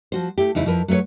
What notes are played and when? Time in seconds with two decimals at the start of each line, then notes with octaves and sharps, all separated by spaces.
0.12 F3 F#4 C5
0.38 A3 E4 G4
0.55 E2 C#3 D#4 E4
0.66 F2 F3 E4 A#4 B4
0.88 F#3 A3 F4 B4 C#5